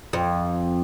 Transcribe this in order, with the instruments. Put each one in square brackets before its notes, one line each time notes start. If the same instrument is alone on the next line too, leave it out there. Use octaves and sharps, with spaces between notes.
[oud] F2